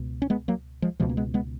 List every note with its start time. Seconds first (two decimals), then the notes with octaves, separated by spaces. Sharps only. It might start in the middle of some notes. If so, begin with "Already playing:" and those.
Already playing: C#2 B2
0.22 C#4
0.30 G#3 B3
0.48 F#3 A#3
0.82 F3 G#3
1.00 C#2 B2 F3 G#3
1.09 A#3
1.17 G#3 B3
1.34 G#3 B3